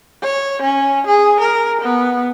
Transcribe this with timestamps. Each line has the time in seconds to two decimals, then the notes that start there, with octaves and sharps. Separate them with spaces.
0.23 C#5
0.62 C#4
1.07 G#4
1.40 A#4
1.82 B3